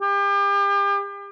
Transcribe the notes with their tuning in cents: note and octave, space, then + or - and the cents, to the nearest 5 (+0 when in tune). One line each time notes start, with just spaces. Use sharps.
G4 +35